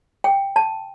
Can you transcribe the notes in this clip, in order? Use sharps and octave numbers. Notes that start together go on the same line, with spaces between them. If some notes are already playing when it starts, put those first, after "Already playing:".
G5
A5